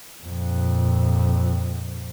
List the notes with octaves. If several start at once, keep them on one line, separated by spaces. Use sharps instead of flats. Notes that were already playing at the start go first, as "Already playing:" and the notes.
F2 A#2